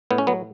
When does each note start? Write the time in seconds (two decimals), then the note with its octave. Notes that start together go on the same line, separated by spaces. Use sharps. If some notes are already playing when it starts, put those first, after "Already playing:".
0.11 A2 B3
0.18 C#4
0.27 F#3 B3